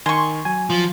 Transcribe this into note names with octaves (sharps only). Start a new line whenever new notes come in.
D#3 G#5 C6 C#6
F#3 G#5
F3